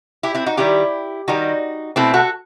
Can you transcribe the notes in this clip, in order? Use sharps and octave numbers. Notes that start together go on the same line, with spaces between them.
E4 G4
C4 E4
D#4 F#4
D#3 G3 E4 G4
D#3 G3 D#4 F#4
B2 A3 C4 E4
F#4 A4